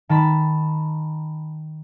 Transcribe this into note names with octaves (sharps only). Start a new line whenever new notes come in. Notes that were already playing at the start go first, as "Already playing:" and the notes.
D#3 A5 B5